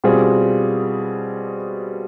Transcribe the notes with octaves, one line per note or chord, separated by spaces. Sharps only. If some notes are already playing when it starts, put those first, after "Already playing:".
B2 G3 C4 F4 G#4